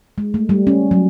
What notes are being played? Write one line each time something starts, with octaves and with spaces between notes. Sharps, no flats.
G#3
A3
G3
C#4
F#3